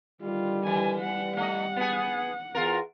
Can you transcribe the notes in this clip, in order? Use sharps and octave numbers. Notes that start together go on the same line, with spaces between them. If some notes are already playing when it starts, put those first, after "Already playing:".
D3 D#3 G3 F4
E3 G#5
G3 F#5
A3 D#5 F#5
B3 G#4
E2 F4 G#4 A#4